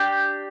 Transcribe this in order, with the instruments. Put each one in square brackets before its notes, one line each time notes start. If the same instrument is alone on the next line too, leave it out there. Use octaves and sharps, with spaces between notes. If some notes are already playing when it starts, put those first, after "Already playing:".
Already playing: [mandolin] D4 G4